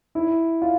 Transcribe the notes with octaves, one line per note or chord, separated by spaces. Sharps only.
E4
F4